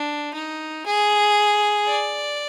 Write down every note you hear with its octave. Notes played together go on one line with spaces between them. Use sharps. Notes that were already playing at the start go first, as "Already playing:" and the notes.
Already playing: D4
D#4
G#4
D5